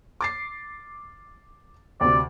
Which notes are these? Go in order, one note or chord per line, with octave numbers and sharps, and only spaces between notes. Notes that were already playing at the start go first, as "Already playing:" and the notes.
D6 A6 C7
D2 C3 D5